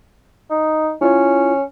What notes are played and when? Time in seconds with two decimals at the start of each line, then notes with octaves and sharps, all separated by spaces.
0.50 D#4
1.01 C#4 E4 F4 C#5